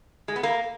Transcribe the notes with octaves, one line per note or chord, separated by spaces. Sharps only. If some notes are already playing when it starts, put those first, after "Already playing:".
G#3
B3
A#3